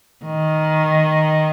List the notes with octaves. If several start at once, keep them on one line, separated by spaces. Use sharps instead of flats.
D#3